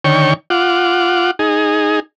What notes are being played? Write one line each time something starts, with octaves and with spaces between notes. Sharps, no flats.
D3 D#3 C#5 G5 C#6
F4 F#5 D6
D#4 G#4